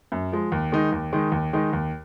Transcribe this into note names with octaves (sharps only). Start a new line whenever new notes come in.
F#2
F3 G#3
D#2
D#3 G#3 D#4
D#2
D#3 G#3 D#4
D#2
D#3 G#3 D#4
D#2